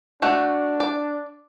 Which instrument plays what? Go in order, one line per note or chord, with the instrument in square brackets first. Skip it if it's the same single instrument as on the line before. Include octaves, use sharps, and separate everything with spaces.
[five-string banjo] A3 F#4 [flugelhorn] D4
[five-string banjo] D5